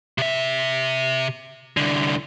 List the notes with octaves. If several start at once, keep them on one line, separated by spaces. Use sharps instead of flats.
C3 E5
C2 D3